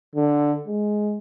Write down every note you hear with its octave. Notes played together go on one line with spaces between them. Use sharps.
D3
G#3